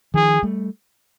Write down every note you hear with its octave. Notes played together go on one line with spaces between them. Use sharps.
D#3 F3 G#4
G3 A3